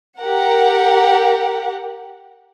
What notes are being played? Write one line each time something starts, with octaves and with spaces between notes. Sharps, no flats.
G4 A#4 F#5